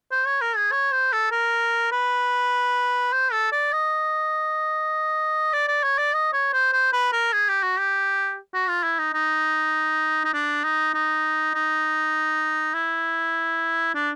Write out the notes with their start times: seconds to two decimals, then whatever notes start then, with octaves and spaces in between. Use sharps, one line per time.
0.11 C5
0.26 C#5
0.41 A#4
0.56 G#4
0.72 C#5
0.92 C5
1.12 A4
1.32 A#4
1.92 B4
3.12 C5
3.32 A4
3.52 D5
3.72 D#5
5.53 D5
5.68 D5
5.83 C#5
5.98 D5
6.13 D#5
6.33 C#5
6.53 C5
6.73 C5
6.93 B4
7.12 A#4
7.33 G#4
7.48 G4
7.63 F#4
7.78 G4
8.54 F#4
8.68 F4
8.83 E4
8.99 D#4
9.13 D#4
10.24 D#4
10.34 D4
10.64 D#4
10.94 D#4
11.54 D#4
12.74 E4
13.94 D4